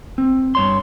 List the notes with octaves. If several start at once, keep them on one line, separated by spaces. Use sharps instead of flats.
C4
G2 C#5 C6